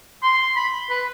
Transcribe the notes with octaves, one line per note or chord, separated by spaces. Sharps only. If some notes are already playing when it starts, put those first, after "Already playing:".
C6
B5
B4